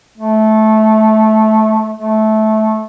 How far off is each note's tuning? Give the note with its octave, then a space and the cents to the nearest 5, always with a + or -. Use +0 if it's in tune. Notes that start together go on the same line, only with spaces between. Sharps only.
A3 -15
A3 -15